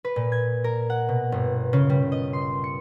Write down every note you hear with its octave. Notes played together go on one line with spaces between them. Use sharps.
B4
A#2
G#6
A#4
F#5
B2
G1
C#3
G3
D#5
C6
C#7